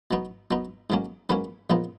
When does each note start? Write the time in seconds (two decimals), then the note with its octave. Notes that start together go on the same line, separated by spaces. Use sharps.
0.11 B2 F#3 B3 D#4
0.51 B2 F#3 B3 D#4
0.90 G#2 D#3 F#3 A#3 C#4
1.29 G#2 D#3 F#3 A#3 C#4 B4
1.70 A#1 A#2 F3 B3 D#4